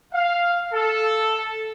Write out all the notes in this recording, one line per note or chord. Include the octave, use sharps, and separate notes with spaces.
F5
A4